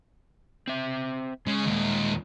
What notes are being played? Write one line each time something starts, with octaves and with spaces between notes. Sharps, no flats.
C4 E5
C#3 G#3
D#2 A#2